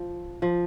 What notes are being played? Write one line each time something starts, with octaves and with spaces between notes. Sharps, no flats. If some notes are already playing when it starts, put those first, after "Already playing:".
Already playing: F3
F3